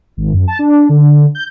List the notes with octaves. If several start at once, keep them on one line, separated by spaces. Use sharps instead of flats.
G#1
F#2
A5
D4
D3
G6